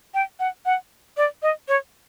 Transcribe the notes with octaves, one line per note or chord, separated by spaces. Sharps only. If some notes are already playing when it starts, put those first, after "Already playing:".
G5
F#5
F#5
D5
D#5
C#5